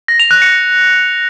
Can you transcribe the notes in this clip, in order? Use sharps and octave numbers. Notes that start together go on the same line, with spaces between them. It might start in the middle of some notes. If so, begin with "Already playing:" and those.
A#6
F7
F#6
C#7